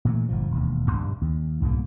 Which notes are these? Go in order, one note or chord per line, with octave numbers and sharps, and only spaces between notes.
A#2 E3 A3
G1 A#2 F3
E1 D#2
A#1 E2 G2 G3
D#2
C2 G#2 B2 A#3